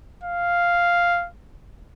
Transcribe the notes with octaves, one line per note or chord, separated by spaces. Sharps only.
F5